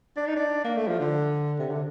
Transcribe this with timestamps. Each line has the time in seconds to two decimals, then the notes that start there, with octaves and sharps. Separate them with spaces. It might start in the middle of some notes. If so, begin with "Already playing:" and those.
0.17 D4
0.27 D#4
0.36 D4
0.65 A#3
0.77 A3
0.88 F3
1.00 D3
1.59 C3
1.71 D3